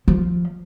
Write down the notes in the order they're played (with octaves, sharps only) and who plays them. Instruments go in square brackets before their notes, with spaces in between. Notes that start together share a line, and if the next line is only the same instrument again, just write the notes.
[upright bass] F3